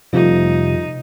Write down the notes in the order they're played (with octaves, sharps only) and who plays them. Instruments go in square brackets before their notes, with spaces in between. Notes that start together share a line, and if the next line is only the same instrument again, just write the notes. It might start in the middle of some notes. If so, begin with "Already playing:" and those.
[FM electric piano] F2 G3 A3 [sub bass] C3 [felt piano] F3 [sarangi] D#4